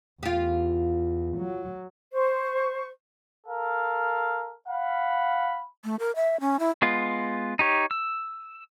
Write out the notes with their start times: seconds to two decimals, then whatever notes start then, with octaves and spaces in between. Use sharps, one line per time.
0.23 E2 F4 G4
1.38 F#3
2.13 C5 C#6
3.47 A4 A#4 F5
4.68 F5 F#5 B5
5.84 A3
5.99 A#4
6.16 E5
6.40 C#4
6.59 E4
6.82 G#3 B3 F4
7.59 D#4 G4 C#5
7.91 E6